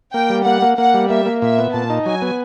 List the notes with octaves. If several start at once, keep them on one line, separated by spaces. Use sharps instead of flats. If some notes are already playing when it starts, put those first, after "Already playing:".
A#3 G5
G3
A#3 F#5
A#3
A#3 F#5
G3
A#3 E5
A#3
A#2 E5
B3
A#2 A5
D#4
F#3 G#5
B3